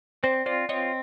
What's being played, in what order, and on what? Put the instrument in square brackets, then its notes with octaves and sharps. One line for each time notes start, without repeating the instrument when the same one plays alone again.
[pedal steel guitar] C4 [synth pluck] C5 D5
[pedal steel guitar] F4 [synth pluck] C5 D5
[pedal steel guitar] C4 [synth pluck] C#5 D#5